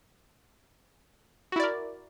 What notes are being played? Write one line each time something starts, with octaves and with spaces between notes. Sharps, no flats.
E4 F#4 A#4 D5